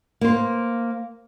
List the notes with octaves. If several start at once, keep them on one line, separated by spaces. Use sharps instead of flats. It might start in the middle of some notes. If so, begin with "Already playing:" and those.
A#3 C5